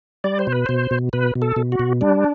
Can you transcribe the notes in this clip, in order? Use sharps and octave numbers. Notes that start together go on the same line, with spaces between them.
G3 D5
C5
B2
B4
B2 C5
B2
B2 B4
B2
A4
B2
F#4
B2
G3 D4